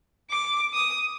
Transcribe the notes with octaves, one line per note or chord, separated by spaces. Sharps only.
D6
D#6